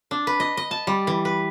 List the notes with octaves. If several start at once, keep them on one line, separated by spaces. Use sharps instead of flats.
D4
B4
D#5
D#5
A5
G3
E3
B4